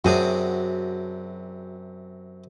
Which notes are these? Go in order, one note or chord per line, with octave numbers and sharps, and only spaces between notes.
F#2 C3 D4 F#4 G#4